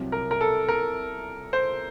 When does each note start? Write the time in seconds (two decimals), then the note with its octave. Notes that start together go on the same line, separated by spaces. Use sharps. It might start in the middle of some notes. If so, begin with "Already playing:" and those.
Already playing: C2 C3 F#3
0.12 A#4
0.31 A#4
0.41 A4
0.68 A#4
1.53 C5